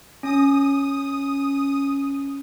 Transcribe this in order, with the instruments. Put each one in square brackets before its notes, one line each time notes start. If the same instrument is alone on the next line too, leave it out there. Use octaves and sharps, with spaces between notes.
[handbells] C#4 [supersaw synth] D#6